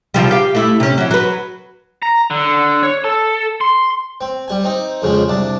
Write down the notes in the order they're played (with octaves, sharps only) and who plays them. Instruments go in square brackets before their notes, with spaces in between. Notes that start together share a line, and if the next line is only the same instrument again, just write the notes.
[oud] C3 F3 G3
G4 F5
A3 E4
C3 C#4
E3 F#3
F#3 B4
[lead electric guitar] A#5
D3
C#5
A4
C6
[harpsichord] C4
G3 G#5
C4 D#4
F2 C#3 F3 G#3
C2 D4 A5